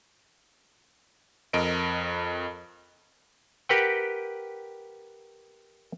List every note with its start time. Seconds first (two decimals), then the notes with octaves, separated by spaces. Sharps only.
1.53 F2 A#4 D#5 D7
3.69 G4 A#4 B4 F#5 G5